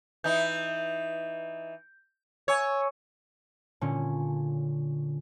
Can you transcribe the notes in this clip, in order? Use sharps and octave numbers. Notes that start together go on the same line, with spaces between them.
E3 D#4 G6
C#5 G#5 E6 G#6
A#2 D3 C#4